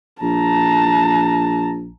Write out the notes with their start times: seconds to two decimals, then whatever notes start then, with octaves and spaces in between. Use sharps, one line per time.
0.22 A#1 A5 A#5